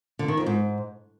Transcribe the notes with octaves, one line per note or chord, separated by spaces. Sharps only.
D3
D#3
F2
G#2